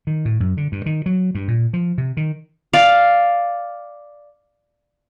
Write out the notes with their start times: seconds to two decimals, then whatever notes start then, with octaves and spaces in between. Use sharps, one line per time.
0.07 D#3
0.25 A2
0.40 F#2
0.57 D3
0.72 G2
0.86 D#3
1.06 F#3
1.35 G2
1.48 A#2
1.73 F3
1.98 C3
2.17 D#3
2.73 D5 F5